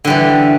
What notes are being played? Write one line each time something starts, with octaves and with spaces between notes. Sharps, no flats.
D3 E3 G3